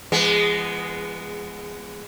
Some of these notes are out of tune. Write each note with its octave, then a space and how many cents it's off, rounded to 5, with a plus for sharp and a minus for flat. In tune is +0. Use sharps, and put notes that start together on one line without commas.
F3 -45 G#3 -10 B3 +0